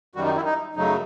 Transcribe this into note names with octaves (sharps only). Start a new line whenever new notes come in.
F#2 D#3 G3 F#4
D#4
E4
D#4
F#2 C#3 F#3 A3 D#4